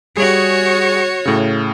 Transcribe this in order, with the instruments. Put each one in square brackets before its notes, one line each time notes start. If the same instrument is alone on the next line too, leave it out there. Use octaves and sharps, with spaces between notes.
[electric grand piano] G3 G#4 [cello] F#4 C#5
[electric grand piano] A2 C#3